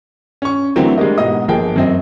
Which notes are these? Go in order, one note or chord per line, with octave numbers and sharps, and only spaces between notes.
C#4 C#6
D3 E3 F#3 A3 C4 A#4
G3 G#3 D4 G4 A#4 D#5
G#2 B2 D#5 D#6
G1 F3 A#3 G#4 G5 A5
F#2 C4 D#5